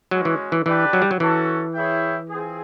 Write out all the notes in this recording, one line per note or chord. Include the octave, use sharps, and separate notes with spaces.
F#3 G#3 C#4 F#4
E3
E3
E3 D4 G4 B4 D5 G5
F#3
G3
F#3
E3 C#4 F#4 A4
E4 G#4 C#5 E5 G5
C4 F4 G#4